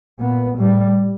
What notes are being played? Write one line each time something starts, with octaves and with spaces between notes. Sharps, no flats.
A#2 B3
A2 G3